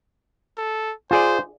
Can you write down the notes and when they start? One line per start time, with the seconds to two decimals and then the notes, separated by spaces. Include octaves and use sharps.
0.57 A4
1.11 F4 G#4 C5 D5